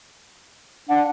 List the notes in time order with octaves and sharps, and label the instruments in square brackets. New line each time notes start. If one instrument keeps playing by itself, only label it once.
[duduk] D4 [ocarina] F#5